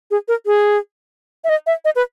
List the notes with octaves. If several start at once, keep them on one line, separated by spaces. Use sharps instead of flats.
G#4
A#4
G#4
E5
D#5
E5
D#5
B4